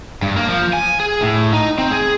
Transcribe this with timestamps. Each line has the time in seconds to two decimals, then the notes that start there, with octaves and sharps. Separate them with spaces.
0.22 G2
0.36 A#3
0.48 F3
0.73 G#5
1.00 G#4
1.21 A2
1.53 D#4
1.78 C4
1.91 G#4